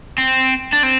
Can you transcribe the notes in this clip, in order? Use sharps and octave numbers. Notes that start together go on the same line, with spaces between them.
C4
D4
C4